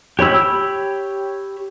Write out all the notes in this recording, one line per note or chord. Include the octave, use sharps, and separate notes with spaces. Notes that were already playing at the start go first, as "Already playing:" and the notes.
G4 C#5 B5 E6